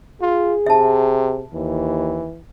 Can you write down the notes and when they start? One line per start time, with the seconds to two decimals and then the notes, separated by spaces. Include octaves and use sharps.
0.22 F4 G#4
0.66 C3 E5 A5
1.53 D#2 E3